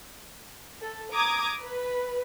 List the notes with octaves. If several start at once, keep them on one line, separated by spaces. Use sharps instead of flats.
A4
A#5 D6 D#6 G#6
B4